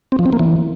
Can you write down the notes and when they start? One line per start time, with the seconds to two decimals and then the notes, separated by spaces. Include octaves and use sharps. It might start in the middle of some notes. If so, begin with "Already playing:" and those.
0.12 C4
0.19 F3
0.26 C4
0.33 A#3
0.39 E3